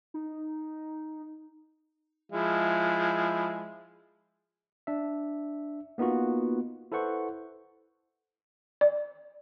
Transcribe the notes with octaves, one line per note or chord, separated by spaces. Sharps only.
D#4
F3 G#3 E4
D4 E5
A#3 B3 D#4 F4 F#4
E4 A4 B4 C5 F#5 C#6
D5